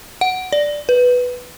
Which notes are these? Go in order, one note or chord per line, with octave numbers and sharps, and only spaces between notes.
F#5
D5
B4